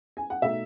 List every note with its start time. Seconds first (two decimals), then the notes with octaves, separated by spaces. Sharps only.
0.17 G#5
0.30 F#5
0.42 B2 A3 D#4 E5